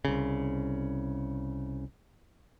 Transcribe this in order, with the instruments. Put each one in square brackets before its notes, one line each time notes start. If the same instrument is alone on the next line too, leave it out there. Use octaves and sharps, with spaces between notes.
[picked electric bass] C2 C#3